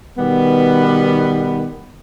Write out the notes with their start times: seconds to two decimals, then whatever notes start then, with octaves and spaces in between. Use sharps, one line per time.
0.17 B2 D#3 G3 B3